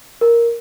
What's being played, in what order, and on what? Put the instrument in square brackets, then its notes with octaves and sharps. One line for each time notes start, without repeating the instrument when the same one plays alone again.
[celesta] A#4